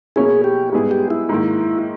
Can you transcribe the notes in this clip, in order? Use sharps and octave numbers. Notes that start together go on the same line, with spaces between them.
B2 A#3 C#4 E4 G#4
G4
G#2 G3 B3 E4 G#4
G4
E4
G#2 D#3 A#3